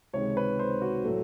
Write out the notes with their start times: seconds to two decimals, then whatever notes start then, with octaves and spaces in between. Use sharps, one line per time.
0.13 C#2 C3 D#3 G#3 C#5
0.37 B4
0.59 C5
0.82 F#4
1.05 A2 F#3 A3